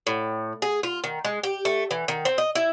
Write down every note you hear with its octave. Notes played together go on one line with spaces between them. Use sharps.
A2
G#4
F4
D#3
G#3
G4
A3
E3
D#3
C4
D#5
E4